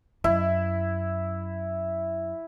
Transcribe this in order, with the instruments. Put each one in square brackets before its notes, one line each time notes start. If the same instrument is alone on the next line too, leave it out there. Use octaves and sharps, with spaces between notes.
[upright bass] F#2 [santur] E4